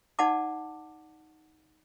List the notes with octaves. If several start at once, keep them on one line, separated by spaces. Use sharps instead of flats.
D#4 D5 F#5 A5 D6